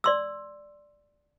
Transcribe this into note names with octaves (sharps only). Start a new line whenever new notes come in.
D5 C6 E6